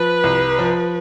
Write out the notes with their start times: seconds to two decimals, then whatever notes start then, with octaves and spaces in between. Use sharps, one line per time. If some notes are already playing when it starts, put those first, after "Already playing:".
Already playing: F3 B4
0.24 C2
0.59 F3